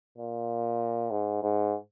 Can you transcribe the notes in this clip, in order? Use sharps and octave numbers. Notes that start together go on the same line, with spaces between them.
A#2
G#2
G#2